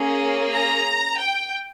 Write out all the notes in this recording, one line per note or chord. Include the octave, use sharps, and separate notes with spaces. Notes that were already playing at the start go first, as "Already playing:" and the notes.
Already playing: A#3 C#4 G#4
A#5
G5